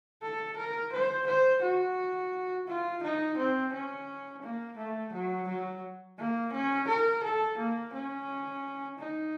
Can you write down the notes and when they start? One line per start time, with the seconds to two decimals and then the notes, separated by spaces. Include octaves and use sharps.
0.22 A4
0.57 A#4
0.92 C5
1.27 C5
1.62 F#4
2.67 F4
3.03 D#4
3.37 C4
3.73 C#4
4.43 A#3
4.77 A3
5.13 F#3
5.48 F#3
6.18 A#3
6.53 C#4
6.88 A#4
7.23 A4
7.58 A#3
7.93 C#4
8.99 D#4